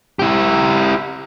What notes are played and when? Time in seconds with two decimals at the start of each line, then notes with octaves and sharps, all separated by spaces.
0.19 E4 G4